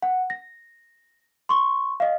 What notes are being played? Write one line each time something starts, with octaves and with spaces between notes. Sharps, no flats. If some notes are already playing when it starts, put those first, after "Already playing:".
F#5
A#6
C6 C#6
D#5 F5